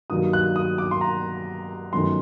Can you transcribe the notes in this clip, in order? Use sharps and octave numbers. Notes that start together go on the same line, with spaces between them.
G2 D#3 F#3 A#3 D#6
F#6
D#6
D6
C6
A#5
G1 F#2 D#3 A3 C6